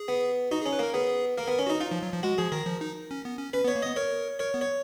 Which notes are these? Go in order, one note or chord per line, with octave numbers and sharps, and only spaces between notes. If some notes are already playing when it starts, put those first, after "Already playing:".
Already playing: G#4
B3
D#4 F#4
G#4
C#4
B4
A#3 A#4
B3 G#4
A#3 A#4
B3 A#4
C#4
D#4 F#4
D#4 F4
F3
F#3
F3
G#3 F#4
F3 G#4
D#3 A#4
F3
D#4
C#4
B3
C#4
C#4 B4
B3
C#5
A#3
B3 D#5
A#4 C#5
A#4 C#5
B3
C#5